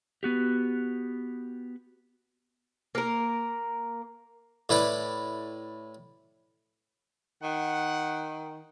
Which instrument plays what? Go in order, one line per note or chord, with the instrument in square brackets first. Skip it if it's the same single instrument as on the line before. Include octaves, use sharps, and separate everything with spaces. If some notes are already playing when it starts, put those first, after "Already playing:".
[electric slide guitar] B3 F#4 G4
[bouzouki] A#3 A#4
[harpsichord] A2 E4 B4 D5 B5
[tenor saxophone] D#3 [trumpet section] F#5